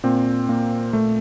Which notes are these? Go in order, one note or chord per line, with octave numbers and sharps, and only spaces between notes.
A#2 C4
A#2 A#3
A#2 A3